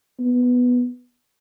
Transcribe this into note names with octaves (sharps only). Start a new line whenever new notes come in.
B3